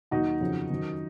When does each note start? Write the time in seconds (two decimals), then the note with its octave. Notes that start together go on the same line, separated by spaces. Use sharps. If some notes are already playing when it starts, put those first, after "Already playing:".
0.11 D#2 D#3 F#3 D#4 F#4
0.40 F2 C#3 F#3
0.70 F#2 D#3 F#3